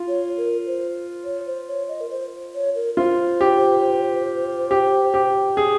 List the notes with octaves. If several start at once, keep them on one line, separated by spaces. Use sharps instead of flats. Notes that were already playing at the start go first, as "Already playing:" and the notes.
Already playing: F4
C#5
A#4
C5
C#5
C5
C#5
D#5
A#4
C5
C#5
A#4
F4 C5
G4
G4
G4
G#4